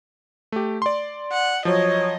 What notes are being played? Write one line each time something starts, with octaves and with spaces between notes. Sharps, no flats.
A3 G4
D5 C6
F#5
F3 F#3 C#5 D#5